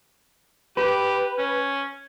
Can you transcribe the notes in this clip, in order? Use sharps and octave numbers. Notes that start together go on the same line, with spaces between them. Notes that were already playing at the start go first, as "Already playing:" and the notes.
G4 B4
C#4